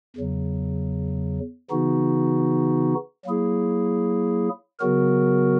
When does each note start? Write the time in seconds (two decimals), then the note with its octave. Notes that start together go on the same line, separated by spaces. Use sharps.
0.16 E2 C#3 F#3
1.71 C#3 E3 B3 D#4 F#4
3.25 F#3 A#3 E4 G#4
4.80 C#3 F#3 B3 F#4 A#4